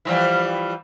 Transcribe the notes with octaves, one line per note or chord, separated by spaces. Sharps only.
E3 F3 G3